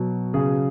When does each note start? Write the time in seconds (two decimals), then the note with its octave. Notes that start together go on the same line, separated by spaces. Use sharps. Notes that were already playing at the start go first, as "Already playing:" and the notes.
Already playing: B2 F#3
0.34 C#3 G#4